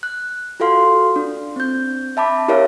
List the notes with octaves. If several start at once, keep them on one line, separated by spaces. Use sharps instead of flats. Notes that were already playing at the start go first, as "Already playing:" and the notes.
F#6
F4 F#4 A4 F5 C6
D4
C4 G6
E5 A5 B5 D6
E4 G4 A#4 C#5 E5 F5